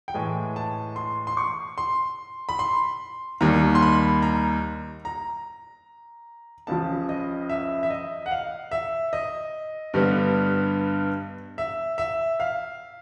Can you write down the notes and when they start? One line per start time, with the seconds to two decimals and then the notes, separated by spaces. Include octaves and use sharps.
0.08 G5
0.14 A2 E3 G#3 G#5
0.56 A5
0.96 C6
1.27 C6
1.37 C#6
1.78 C6
2.49 B5
2.59 C6
3.41 D#2 D#3 G3 A#5
3.75 C6
3.82 B5
4.22 A#5
5.05 A#5
6.67 C#2 C#3 F3 A5
7.09 D#5
7.49 E5
7.83 E5
7.90 D#5
8.26 F#5
8.31 F5
8.71 E5
9.13 D#5
9.94 G2 D3 G3 B3
11.58 E5
11.98 E5
12.40 F5